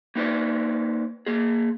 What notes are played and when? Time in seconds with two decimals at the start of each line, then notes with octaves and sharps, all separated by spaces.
0.16 A#3 D#4 B4 C5 D5
1.26 A#3 G#4